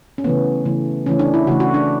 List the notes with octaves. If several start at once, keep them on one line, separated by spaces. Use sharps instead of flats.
C#4
C#3 E3 A3 B3
C#3 E3 A3
C#3 E3 A3 C#4
D4
E4
C#3 E3 A3 F#4
F#4
D4